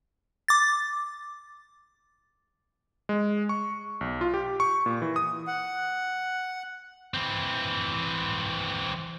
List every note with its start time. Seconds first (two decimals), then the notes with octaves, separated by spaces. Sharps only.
0.48 D6 A6
3.09 G#3
3.49 C#6
4.01 B1
4.21 F4
4.34 G4
4.60 C#6
4.86 A#2
5.02 E3
5.16 D#6
5.47 F#5
7.14 E3 C4